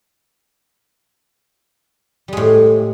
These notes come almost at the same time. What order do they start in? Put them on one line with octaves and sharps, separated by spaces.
G3 G#3 A2